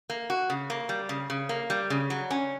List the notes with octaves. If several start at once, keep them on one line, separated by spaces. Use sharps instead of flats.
A#3
F#4
C#3
A#3
G3
C#3
C#3
A#3
G3
C#3
F#3
C#4